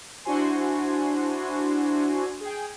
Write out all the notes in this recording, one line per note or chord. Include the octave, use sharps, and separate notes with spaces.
D4 E4 F#4 C5 G#5 C6
G#4 G5